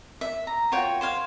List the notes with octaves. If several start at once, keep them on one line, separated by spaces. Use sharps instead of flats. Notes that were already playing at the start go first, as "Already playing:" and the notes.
E5
A#5
F4 F#4 C#5 G5
C5 C#5 F5